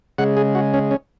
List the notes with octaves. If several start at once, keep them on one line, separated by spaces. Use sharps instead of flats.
C#3 G#3 F#5
G#4
F#4
C#4
C#4